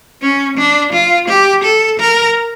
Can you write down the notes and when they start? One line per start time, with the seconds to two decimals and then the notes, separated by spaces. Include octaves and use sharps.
0.22 C#4
0.58 D4
0.93 F4
1.28 G4
1.64 A4
2.00 A#4